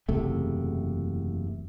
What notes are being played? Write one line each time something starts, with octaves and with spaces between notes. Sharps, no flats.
F#1 E2 C3 A3